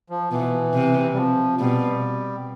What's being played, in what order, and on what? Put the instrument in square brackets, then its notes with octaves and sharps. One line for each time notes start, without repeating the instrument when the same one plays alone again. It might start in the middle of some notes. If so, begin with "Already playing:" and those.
[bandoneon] F3
[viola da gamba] B2 [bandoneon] E3
[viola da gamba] C3
[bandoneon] G3
F3
[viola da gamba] B2 [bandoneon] G3